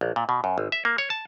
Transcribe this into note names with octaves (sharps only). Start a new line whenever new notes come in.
A#1
A#2
B2
F#2
G#1
E5
A#3
C#5
A5